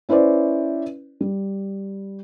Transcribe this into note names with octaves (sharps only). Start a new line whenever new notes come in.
C#4 E4 B4 C5 D5
G3